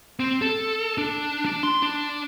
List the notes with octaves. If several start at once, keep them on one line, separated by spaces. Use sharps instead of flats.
C4
A4
D4
D4
C6
D4